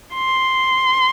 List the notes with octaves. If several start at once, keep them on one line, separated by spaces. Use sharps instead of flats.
C6